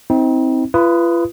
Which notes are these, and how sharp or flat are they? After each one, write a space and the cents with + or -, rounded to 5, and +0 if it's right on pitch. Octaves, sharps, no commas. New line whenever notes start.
C4 +0 D#4 +40
F4 -40 B4 +0 D#6 +0